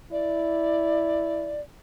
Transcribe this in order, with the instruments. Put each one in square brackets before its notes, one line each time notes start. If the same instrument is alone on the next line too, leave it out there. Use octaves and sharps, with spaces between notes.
[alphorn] E4 [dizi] D5